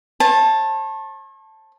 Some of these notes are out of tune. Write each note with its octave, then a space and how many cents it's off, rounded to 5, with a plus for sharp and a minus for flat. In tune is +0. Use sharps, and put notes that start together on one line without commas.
C#5 -45 A5 +0